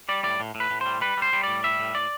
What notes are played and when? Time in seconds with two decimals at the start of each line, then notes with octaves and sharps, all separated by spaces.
0.09 G3 D5
0.23 A2 D5
0.40 A2
0.55 A2
0.60 B4
0.70 A2
0.81 G3 C5
1.01 G3 B4
1.17 G3 C5
1.33 G3
1.43 A2 D5
1.64 G3 E5
1.80 A2
1.95 A2 D5